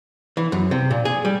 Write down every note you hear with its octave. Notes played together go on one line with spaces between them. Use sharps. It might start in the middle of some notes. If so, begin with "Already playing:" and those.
E3
F#2
C3
A#2
G#4
G3